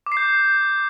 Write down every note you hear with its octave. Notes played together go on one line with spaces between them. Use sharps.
D6
C7
G6